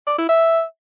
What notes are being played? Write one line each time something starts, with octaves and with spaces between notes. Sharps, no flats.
D5
E4
E5